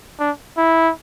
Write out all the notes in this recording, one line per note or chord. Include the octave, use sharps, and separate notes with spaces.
D4
E4